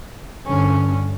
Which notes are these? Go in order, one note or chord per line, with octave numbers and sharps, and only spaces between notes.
G2 D3 C#4